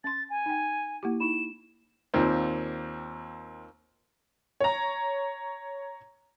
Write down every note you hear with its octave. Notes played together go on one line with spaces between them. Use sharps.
C#4 C6 A6
G#5
D#4 G5
A#3 E4 G4
D#4 E4 E7
D#2 A#2 C4
C#5 A#5